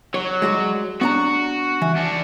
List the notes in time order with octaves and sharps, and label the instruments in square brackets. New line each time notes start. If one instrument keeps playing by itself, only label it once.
[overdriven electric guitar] F#3 [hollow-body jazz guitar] C#5
[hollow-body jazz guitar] G#3 F#4 D5
[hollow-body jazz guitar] B3 D4 A#5 [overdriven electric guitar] F#4
[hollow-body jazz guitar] E3
[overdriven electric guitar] D4 F#4